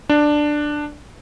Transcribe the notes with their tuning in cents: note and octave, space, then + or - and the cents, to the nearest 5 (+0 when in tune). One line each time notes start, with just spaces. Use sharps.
D4 +10